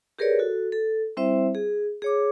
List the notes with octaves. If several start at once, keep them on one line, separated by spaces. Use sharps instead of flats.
G4 G#4 A#4 B4 C#5 D5
F#4 A4
A4
G3 C4 E4 C5 E5
G#4
G#4 C#5 D6